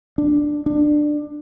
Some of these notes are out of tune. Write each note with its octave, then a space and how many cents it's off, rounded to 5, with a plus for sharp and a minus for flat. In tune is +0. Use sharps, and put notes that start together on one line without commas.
D4 +5
D4 +20